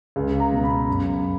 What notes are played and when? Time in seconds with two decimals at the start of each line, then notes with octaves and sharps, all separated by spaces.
0.16 C#2
0.40 A#5
0.52 B2
0.64 B5
0.88 F#2